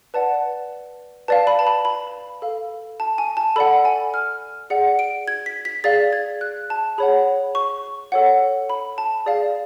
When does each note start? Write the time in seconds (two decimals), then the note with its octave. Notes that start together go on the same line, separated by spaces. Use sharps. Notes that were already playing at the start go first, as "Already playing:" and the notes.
0.14 B4 D5 F#5 A5
1.28 B4 D5 F5 A5
1.47 B5
1.59 A5
1.67 B5
1.85 B5
2.42 A4 F5
3.00 A5
3.18 G#5
3.37 A5
3.56 A4 D5 F#5 B5
3.85 G#5
4.14 F6
4.70 G#4 D5 F#5 C#7
4.99 D7
5.28 G#6
5.46 B6
5.65 B6
5.84 G#4 D5 F5 A6
6.13 G#6
6.41 F#6
6.70 A5
6.98 G#4 C#5 F#5 B5
7.55 C#6
8.12 A4 C#5 F#5
8.70 B5
8.98 A5
9.26 G#4 D5 F5